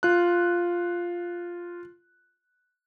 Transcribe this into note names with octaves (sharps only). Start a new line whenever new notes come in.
F4 F#6